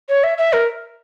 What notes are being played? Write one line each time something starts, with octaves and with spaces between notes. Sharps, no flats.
C#5
E5
E5
A#4